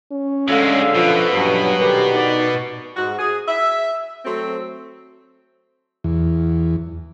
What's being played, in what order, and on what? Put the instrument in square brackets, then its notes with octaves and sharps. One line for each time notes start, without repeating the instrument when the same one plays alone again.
[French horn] C#4
[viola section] D3 E5 F5 [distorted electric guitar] F#3 G#3
[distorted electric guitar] B2 [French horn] F3
[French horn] G2 [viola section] F#3 C#4
[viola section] D3 D#3 G4 [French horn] B4
[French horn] D#4 [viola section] D5
[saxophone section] G#2 F#4
G#4
E5
F#3 A3 C4
[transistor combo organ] E2